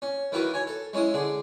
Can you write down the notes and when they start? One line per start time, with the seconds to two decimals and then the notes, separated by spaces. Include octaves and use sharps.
0.02 C#4
0.32 D#3 E3 E4 F#4 A#4 B4
0.54 C#5 G#5
0.67 A4
0.93 G#3 C#4 E4 D#6
1.14 D3 G#4